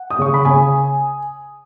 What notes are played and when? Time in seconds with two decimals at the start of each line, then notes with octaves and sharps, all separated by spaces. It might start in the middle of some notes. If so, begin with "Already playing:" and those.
Already playing: F#5
0.10 D#6
0.18 C#3 C#6
0.34 B5
0.45 C#3 G#5